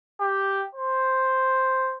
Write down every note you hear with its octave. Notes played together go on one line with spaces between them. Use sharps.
G4
C5